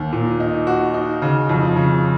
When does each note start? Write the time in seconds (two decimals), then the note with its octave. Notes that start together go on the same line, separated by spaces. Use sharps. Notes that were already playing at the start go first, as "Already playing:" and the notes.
Already playing: D#2
0.13 A#2
0.40 D#4
0.67 F#4
0.94 D#4
1.22 C#3
1.49 F2
1.76 C#3